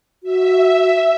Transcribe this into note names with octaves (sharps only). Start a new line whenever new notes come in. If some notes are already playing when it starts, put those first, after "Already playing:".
F#4 E5